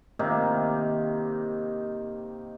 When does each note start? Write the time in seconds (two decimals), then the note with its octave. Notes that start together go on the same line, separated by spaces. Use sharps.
0.19 C3 D#3 A#3 D#4